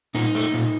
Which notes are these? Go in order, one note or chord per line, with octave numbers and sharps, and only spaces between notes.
A#2 D#4
A3
A#2